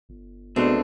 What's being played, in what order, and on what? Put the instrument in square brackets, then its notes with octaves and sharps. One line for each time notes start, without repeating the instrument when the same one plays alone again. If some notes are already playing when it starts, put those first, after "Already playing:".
[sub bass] G1
[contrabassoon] B2 [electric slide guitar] G#3 A3 C4 [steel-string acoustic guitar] D4